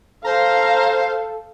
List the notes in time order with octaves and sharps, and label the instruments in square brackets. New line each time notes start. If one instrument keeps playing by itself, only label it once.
[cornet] A4 [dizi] C5 [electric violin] F5 [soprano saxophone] A#5